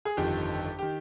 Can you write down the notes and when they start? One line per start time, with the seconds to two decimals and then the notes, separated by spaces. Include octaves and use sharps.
0.05 G#4
0.17 G1 F2 D#3 G4
0.79 D#3 G4